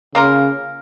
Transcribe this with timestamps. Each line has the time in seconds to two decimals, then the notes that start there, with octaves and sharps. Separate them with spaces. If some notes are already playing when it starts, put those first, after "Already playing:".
0.15 C#3 A#3 F4 A#4